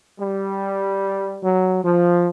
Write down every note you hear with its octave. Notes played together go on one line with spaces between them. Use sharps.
G3
F#3
F3